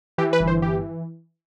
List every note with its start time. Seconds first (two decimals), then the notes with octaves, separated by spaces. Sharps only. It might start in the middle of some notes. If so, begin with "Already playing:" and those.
0.18 E3 G4
0.33 B4
0.40 G1
0.47 C5
0.62 E3 G4